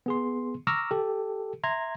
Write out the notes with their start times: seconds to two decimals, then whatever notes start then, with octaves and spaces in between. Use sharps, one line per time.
0.06 B3 G#4 C6
0.67 A#5 C#6 D6 E6 F6 A#6
0.91 G4 A4
1.64 E5 A#5 C6 G#6